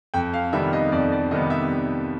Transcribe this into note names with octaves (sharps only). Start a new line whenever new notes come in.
F2 G5
F5
C3 D#3 G3 B3 E5
D#5
F2 D5
D5
C3 D#3 G3 B3 D#5
E5